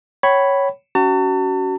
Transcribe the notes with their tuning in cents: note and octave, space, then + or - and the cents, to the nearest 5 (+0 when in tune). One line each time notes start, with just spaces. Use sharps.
C#5 +0 G5 -40 B5 +0
C#4 +20 F#4 +25 A5 +40